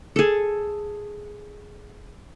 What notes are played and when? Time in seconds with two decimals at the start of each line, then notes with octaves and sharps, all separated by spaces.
0.16 G#4 A4